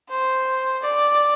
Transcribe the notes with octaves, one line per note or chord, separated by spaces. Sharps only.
C5
D5